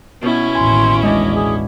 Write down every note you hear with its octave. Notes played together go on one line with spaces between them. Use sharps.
B2 B3 C#4 E4
A1 D#2 G#5 C6
G#3 D4 D#5
G#4